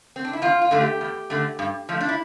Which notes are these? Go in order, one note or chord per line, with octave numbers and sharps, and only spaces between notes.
C4
D4
E4
E2 F4
F4
D3 A3
G4
E2
D3 A3
G2
F3 A3
D4
E4